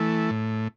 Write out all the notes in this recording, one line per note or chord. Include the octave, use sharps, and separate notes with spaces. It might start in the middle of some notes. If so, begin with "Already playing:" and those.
Already playing: E3 A3
A2